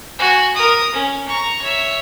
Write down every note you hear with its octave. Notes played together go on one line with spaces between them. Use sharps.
F#4 G#5
A#4 D#6
C#4
A#5 C#6
C#5 E5